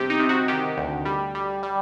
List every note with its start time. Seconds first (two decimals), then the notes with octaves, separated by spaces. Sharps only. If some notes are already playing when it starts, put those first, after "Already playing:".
Already playing: G1 C3 G4
0.10 D#4
0.20 C3
0.29 F#4
0.48 D#3 G4
0.77 D2
1.05 G3
1.35 G3
1.63 G3